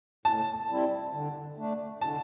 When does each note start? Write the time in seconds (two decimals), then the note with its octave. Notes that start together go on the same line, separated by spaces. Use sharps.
0.25 A2 A5
0.69 G3 C4 E4
1.13 D3
1.57 A3 D4
2.01 D3 A5